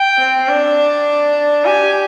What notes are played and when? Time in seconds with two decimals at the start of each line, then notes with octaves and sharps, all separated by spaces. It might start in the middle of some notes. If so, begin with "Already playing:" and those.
Already playing: G5
0.18 C4
0.48 D4
1.65 G4 G#5